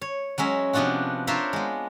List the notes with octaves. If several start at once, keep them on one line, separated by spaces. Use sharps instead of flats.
C#5
F#3 G#3 C#4 E5
C3 F3 B3 D4 F4 F#4
D4 F4 A#4 C5 C#5 E5
G#3 B3